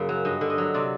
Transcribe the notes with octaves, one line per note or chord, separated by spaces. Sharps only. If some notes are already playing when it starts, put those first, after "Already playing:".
Already playing: F#2 C#3 A#3
F#3
G2 D#5
D3
D#5
F#3
C3 D5